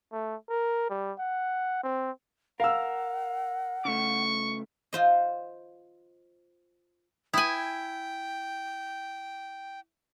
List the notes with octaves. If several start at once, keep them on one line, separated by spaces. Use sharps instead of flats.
A3
A#4
G3
F#5
C4
A#4 F5 F#5 E6
C#3 A3 C#6
F4 C5 D#5
E4 G5 G#5 D#6